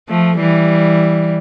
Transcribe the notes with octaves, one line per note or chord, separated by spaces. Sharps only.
F3 A3
E3 G3